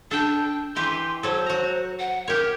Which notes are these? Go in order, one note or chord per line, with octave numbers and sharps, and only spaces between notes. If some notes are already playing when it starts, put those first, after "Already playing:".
D4 A4 G5
E3 G4 B4 C6
F#3 A4 C5
F#4 A#5
F#5
G4 A#4 C#5